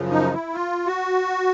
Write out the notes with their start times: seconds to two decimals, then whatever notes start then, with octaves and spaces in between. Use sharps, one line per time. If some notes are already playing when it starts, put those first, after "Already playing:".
Already playing: F#2 C#3 F3
0.11 D#4
0.33 E4
0.54 F4
0.87 F#4